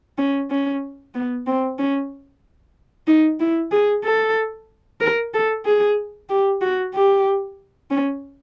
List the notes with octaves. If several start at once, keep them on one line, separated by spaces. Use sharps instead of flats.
C#4
C#4
B3
C4
C#4
D#4
E4
G#4
A4
A#4
A4
G#4
G4
F#4
G4
C#4